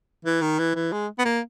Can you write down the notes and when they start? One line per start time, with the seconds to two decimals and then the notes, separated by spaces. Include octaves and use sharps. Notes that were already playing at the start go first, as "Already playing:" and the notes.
0.25 E3
0.41 D#3
0.59 E3
0.75 E3
0.92 G#3
1.19 B3
1.25 A#3